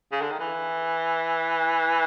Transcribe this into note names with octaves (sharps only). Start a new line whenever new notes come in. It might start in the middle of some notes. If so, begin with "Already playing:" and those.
C#3
D3
D#3
E3